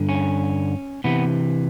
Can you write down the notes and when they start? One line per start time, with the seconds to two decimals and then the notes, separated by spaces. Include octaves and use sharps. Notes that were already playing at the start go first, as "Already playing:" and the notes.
Already playing: G2 D3
0.09 C#4
1.04 C3 E3 B3